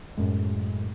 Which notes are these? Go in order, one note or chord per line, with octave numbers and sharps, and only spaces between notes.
F#2 A2 G#3